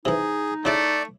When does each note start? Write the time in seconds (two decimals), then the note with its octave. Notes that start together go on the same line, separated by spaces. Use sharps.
0.05 C3 E3 D#4 G#4
0.65 C#3 A3 E4 D5 D6